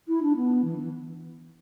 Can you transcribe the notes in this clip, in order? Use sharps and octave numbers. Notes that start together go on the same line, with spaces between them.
E4
D4
B3
E3
E3